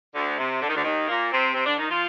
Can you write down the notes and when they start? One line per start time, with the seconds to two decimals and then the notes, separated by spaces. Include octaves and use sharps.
0.14 D2 D3
0.38 C3
0.61 D3
0.68 D#3
0.75 D2 D3
0.84 D#2 D#3
1.08 A#2 A#3
1.31 C3 C4
1.54 C3 C4
1.66 D3 D4
1.78 D#3 D#4
1.89 F3 F4